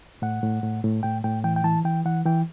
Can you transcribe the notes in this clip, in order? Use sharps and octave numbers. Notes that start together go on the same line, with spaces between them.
A2 F#5
A2
A2
A2
A2 G5
A2 G5
E3 G5
G5
E3 A5
E3 G5
E3 F#5
E3 G5